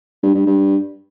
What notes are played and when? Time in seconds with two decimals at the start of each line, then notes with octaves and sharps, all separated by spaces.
0.23 G2
0.35 G2
0.46 G2